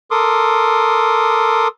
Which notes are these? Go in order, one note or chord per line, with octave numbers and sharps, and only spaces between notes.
A4 A#4 C6 D6 D#6